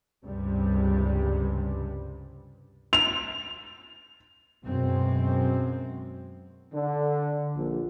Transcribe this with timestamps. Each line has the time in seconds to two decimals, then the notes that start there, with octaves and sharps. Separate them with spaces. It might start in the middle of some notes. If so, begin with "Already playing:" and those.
0.25 C#2 G2 C3 G3
2.93 F7
4.65 F#2 B2 G#3 C4
6.73 D3
7.55 A#1